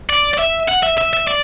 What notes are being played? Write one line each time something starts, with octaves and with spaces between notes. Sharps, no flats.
D5
D5
E5
F#5
E5
E5
E5
D5